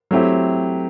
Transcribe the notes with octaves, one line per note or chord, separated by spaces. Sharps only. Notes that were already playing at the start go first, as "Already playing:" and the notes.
F#3 A3 C4 E4 G4